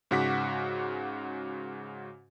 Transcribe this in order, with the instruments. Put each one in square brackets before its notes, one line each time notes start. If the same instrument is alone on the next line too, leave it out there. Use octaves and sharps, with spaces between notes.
[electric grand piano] G#2 C#3 F#4 F#5 D6 B6